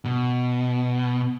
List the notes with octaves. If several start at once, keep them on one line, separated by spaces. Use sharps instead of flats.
B2